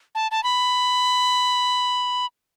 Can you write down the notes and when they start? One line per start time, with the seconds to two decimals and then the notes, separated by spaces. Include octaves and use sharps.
0.15 A5
0.31 A5
0.44 B5